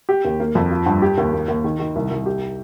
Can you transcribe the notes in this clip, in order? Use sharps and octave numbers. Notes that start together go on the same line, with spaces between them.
G4
D#2
A#3
F2
F4
G2
G4
D#2
A#3
D#2
D#3
D#3
C2
C2
G4